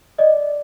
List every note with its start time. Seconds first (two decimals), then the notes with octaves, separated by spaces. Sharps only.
0.18 D5 D#5